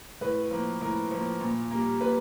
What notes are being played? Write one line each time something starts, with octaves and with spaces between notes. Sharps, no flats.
A2 B4
F3 A#3
A2 A#4
F3 A#3
A#2
G3 A#3
A#2 B4